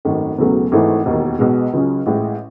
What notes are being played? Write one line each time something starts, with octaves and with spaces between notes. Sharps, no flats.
G#1 F#2 D#3 A3
E1 E2 C#3 F#3 A3
G#1 G#2 E3 A3
E1 D#2 D#3
B1 B2 G#3
C#2 C#3 F#3 C#4 G#4
A1 A2 G#3